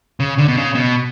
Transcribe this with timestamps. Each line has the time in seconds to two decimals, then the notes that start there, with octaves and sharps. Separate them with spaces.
0.20 C#3
0.38 D3
0.48 B2
0.57 C#3
0.75 B2